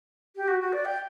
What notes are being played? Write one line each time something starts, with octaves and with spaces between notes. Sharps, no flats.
G4
F#4
F#4
D5
G5